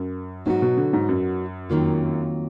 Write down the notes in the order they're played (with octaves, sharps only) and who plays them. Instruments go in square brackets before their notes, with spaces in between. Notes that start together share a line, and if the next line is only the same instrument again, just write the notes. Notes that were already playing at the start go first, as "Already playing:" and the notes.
Already playing: [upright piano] F#2
[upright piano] G#2 [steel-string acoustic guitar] F#3 B3 D#4 F#4
[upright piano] B2
D3
G#2
F#2
[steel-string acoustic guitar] F2 D#3 F#3 A#3 F4